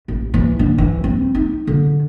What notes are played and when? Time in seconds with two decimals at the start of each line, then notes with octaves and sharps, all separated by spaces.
0.08 A1
0.34 E3
0.59 D3
0.78 E3
1.04 C4
1.35 D#4
1.67 D3